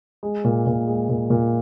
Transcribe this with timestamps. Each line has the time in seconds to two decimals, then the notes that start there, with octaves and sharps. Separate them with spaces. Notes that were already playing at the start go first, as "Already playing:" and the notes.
0.23 G#3
0.44 A#2
0.67 A#2
0.87 G#3
1.09 A#2
1.30 A#2